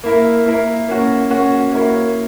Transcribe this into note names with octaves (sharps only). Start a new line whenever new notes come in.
A#3 E4 A#4
A#3 E4 A#4
A#3 C#4 F#4
A#3 C#4 F#4
A#3 E4 A#4 C#5